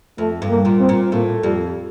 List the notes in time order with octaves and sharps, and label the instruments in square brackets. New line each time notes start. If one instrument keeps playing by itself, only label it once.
[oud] F2 [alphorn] A3
[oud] G2
[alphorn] A#3
[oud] A#2
[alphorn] C4
[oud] A#2
[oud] A2 [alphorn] A#3
[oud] F2 [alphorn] G3